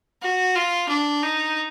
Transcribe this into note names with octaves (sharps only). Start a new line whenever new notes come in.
F#4
F4
D4
D#4